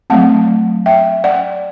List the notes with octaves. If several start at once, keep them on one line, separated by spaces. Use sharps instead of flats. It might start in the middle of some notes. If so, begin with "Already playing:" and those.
F#3 A3 C4 F#5 A5
E5 G5
D5 F#5